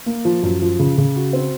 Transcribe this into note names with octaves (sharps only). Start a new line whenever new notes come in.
A#3
F3
F#2
F3
C#3
C#3
F#4
C4